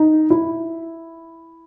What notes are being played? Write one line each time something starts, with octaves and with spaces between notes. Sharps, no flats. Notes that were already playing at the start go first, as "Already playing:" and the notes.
Already playing: D#4
E4